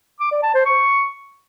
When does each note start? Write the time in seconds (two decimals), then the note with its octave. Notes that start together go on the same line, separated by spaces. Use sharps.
0.20 D6
0.32 D5
0.43 A5
0.54 C5
0.66 C#6